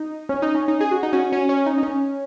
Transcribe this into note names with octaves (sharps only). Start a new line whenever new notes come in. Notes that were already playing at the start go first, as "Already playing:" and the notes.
Already playing: D#4
C#4
D#4
C#4
D#4
G#4
F#4
D#4
C#4 F#4
C#4
C#4
D#4
D#4
C#4